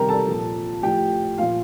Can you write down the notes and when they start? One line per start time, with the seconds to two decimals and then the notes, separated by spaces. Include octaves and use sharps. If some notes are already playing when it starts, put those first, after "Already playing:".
Already playing: C3 D#3 G3 G4 A#4 G5 A#5
0.09 A4 A5
0.27 A#2 F3
0.83 A2 F3 G4 G5
1.38 A#2 F3 F4 F5